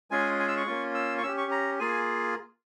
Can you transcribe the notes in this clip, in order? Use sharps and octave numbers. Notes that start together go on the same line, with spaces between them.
G#3 C#4 F4 G#4 G#5
G#5
E6
C#6
A#3 C#4 F4
E6
C#6
C#4 G4 E6
C#6
A#5
A#3 F4 G#4 G#5